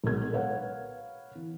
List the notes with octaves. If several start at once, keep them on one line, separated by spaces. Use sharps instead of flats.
B1 G#3 A#4 G#6
A#4 B4 C#5 F5 F#5
E3